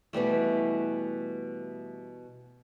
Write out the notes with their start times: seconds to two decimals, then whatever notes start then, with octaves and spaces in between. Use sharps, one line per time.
0.13 B2 E3 G3 A3